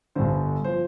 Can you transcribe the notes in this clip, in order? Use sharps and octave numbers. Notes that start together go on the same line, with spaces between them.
G1 G2 D3 C5
F3 C5